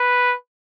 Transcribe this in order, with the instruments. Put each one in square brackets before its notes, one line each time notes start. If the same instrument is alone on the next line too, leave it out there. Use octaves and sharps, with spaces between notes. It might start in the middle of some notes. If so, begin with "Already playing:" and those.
Already playing: [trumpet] B4